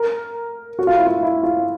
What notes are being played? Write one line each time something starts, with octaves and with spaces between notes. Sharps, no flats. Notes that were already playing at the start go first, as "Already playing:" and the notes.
Already playing: A#4
F#4
F4
E4
F4
E4
F4